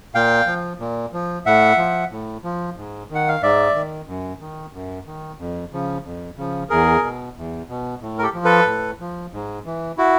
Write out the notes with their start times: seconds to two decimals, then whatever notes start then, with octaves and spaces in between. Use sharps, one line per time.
0.15 A#2 F5 G5
0.47 F3
0.80 A#2
1.13 F3
1.46 A2 E5 F#5
1.78 F3
2.11 A2
2.44 F3
2.77 G#2
3.10 D#3 F#5
3.28 F5
3.42 G#2 D5 E5
3.75 D#3
4.07 F#2
4.40 D#3
4.73 F#2
5.06 D#3
5.38 F2
5.72 C#3 F3
6.04 F2
6.37 C#3 F3
6.70 E2 G#4 A#4
7.03 B2
7.36 E2
7.69 B2
8.01 A2
8.18 A#4
8.23 G4 A4
8.34 F3
8.45 A4 B4
8.66 A2
9.00 F3
9.33 G#2
9.66 E3
9.97 E4 F#4